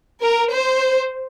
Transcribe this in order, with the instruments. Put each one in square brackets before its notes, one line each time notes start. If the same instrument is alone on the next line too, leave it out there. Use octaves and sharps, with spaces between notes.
[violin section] A#4
C5